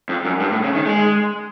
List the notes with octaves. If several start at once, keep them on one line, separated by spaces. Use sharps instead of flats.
F2
F#2
G2
A2
C#3
D#3
G#3